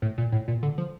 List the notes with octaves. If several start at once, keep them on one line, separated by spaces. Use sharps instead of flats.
A2
A#2
A2
A#2
D3
F3